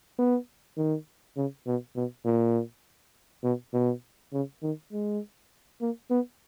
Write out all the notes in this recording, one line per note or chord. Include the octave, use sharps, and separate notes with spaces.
B3
D#3
C#3
B2
B2
A#2
B2
B2
C#3
D#3
G#3
A#3
B3